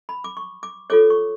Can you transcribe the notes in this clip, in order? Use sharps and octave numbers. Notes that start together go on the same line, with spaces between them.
B5
D6
C#6
D6
F4 A4 C#5 D6
C#6